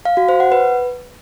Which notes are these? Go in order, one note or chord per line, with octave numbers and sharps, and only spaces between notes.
F5
F#4
C5
F#5
B4